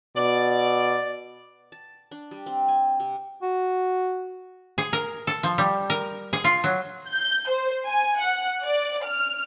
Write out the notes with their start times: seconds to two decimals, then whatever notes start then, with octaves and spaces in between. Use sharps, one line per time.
0.17 B2 D5
1.72 A5
2.11 D4
2.31 G3
2.46 C4
2.68 G#5
3.00 C3
3.42 F#4
4.78 G#4
4.93 A#4
5.27 A4
5.43 F3
5.58 G3
5.90 A#4
6.33 G#4
6.44 F4
6.64 F#3
7.08 G6
7.49 C5
7.86 G#5
8.19 F#5
8.63 D5
9.05 F6